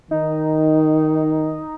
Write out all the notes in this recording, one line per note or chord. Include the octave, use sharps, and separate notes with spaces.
D#3 D#4